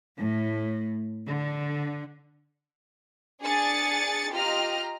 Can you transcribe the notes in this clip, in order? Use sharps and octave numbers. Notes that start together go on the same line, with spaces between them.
A2
D3
D4 G#4 G#5 A6 C#7
F4 G4 D#5 A#5 F6